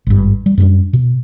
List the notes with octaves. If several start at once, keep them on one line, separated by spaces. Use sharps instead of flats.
G#1 G2
G3
F#2 G3 B3 D4
B2